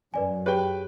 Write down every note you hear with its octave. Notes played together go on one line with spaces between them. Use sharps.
F#2 B4 D5 G#5
G4 G#4 B4 C#5 G5